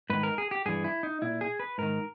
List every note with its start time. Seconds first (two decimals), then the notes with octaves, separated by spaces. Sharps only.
0.10 G#2 D#3 B4
0.23 A#4
0.38 G#4
0.51 G4
0.66 G2 E3 G#4
0.84 E4
1.03 D#4
1.22 A#2 E4
1.41 G#4
1.60 B4
1.78 G#2 D#3 A#4